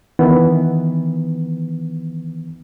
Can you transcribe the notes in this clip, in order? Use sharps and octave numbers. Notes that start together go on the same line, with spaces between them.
D#3 E3 B3